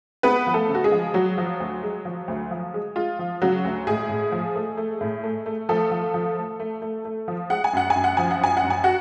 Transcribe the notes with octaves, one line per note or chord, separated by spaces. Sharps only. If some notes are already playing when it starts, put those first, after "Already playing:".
G#3 B3 B4
F3
A3 A4
C#3
F#4
G#3 G#4
F3
F#3 G#3 F#4
F3
D2
G#3
F3
D2
F3
G#3
G#3 F4
F3
C#3 F#3 F#4
D2
A2 G#3 G#4
A2
F3
A3
A3
A2
A3
A3
F3 A3 A4
F3
F3
A3
A3
A3
A3
F3
G#3 F#5
G#5
F#2 F#5
G#5
F#2
F#5
F3 G#5
F#5
F#2 G#5
F#5
F#2
G#5
F#4 F#5